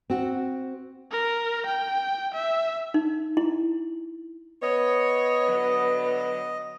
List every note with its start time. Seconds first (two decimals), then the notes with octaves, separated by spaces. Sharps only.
0.10 C4 F#4
1.11 A#4
1.66 G5
2.34 E5
2.94 D#4
3.37 E4
4.62 B3 C#5 D#5
5.46 D3 F#3